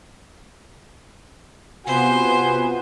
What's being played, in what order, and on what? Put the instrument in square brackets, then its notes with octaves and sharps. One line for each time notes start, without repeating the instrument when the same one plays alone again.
[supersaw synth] C3 B3 B4 [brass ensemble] F4 F#4 F#5 [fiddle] C5 [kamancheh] G#5